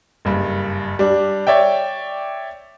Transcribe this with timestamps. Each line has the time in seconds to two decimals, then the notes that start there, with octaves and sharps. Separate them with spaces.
0.25 F#1 G2
0.99 G3 D4
1.47 C#5 D5 E5 G5